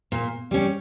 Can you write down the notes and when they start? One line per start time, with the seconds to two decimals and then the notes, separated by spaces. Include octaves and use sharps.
0.12 A#2
0.51 G3 C#4